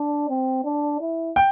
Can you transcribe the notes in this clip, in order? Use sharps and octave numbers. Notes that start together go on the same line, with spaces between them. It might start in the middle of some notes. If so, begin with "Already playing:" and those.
Already playing: D4
C4
D4
E4
G5